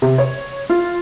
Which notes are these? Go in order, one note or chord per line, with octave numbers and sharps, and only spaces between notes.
C3
C#5
F4